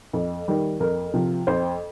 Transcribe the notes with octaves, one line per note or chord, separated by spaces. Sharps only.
F2
D#3 G3
F2 A#4
C3 F3
F2 C5